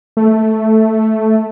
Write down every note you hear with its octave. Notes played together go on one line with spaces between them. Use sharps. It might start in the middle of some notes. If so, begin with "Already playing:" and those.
A3